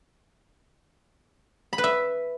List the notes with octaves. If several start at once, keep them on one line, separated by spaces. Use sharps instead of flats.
B5
B4
E5